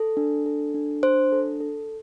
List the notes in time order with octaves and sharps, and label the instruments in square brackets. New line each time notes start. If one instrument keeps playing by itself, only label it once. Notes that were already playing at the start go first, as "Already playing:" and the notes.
Already playing: [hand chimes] A4
D4
A4
D4
D4 C5
A4
A4